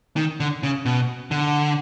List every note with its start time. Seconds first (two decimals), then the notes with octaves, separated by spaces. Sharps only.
0.17 D#3
0.40 D3
0.63 C#3
0.85 B2
1.31 D3